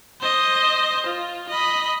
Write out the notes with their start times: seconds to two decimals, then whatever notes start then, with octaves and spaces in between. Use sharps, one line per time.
0.21 C5 D#5
1.06 F4
1.49 D#5 B5